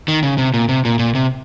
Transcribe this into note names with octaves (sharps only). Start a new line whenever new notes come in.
D#3
C#3
C3
A#2
C3
A#2
A#2
C3